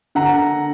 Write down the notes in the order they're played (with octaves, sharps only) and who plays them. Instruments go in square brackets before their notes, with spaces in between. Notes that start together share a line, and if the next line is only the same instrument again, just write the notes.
[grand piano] D3 F#5 A#5